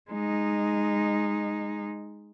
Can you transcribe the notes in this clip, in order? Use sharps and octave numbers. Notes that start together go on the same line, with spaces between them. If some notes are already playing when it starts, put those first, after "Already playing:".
G#3 D#4